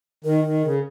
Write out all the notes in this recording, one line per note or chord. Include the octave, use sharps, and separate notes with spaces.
D#3 A#4
D#3
C#3